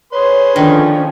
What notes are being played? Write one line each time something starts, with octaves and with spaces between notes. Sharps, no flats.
G#4 B4 C#5 C6
D3 D#3 F3 C#4 D4